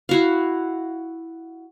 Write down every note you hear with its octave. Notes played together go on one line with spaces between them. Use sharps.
E4 F#4 F5